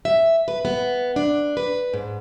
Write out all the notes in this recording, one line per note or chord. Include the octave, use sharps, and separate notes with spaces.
E5
B4
B3
D4
B4
G#2